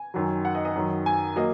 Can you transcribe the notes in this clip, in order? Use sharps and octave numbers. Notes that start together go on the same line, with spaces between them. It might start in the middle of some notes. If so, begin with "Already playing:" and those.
Already playing: G#5
F#2 D#3 F#3
F#5
D#5
D#5
F#2 D#3 F#3
G#5
F#3 A#3 D#5